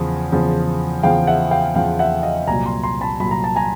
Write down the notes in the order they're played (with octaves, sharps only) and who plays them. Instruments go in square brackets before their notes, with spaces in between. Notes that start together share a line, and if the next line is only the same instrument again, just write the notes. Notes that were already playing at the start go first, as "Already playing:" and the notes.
Already playing: [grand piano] E2 C#3 F3
E2 C#3 F3
E2 C#3 F3 F5 G5
E5 F#5
F5 G5
E2 C#3 F3 F5 G5
E5 F#5
D#5 F5
C2 A#2 F#3 G#5 A#5
A#5 C6
A#5 C6
A5 B5
C2 A#2 F#3 B5
A#5
A5
G#5 A#5